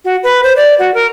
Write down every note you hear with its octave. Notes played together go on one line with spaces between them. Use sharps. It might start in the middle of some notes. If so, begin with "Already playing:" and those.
F#4
B4
C5
D5
F#4
A#4